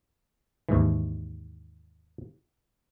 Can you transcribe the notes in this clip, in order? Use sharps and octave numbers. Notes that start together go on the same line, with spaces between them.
D#2 G#2 E3